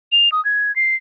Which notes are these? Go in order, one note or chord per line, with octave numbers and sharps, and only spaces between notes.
F7
D#6
G#6
C7